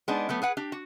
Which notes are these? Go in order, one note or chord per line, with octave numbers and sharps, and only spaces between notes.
G#3 B3 D4 D#4
F#3 A3 B3
G#4 B4 F#5
D4 G4
F#4